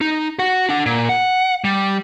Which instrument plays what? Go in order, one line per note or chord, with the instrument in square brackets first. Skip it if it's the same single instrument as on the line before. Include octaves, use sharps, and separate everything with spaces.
[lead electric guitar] D#4
F#4 F#5
D4 F#5
A#2
F#5
G3